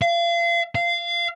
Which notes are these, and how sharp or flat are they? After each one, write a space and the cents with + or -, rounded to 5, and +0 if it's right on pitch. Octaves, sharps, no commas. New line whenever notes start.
F5 -35
F5 -20